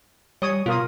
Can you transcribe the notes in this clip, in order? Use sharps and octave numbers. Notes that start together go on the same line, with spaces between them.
G3 C#5 D#6
B2 F4 A#4 D#6